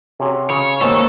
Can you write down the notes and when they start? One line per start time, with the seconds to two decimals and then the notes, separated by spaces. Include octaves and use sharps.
0.20 C3 C#4 F#4 G#4
0.50 C#3 C#5
0.81 G#2 D#3 A#3 G4 A4 C5 C#6